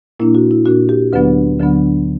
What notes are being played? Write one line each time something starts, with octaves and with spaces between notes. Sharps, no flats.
A#2 A#3 D4 E4
F#4
E4
A#2 A#3 D4 F#4
G4
D2 D3 F#3 B3 D4 B4
D2 D3 F#3 B3 D4